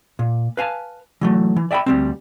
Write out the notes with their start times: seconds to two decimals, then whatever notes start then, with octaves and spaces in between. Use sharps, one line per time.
0.19 A#2
0.57 B4 F5 G#5 A5
1.21 E3 F#3 A3
1.56 E3
1.71 D5 E5 G5 A5 B5
1.86 D2 G3 C4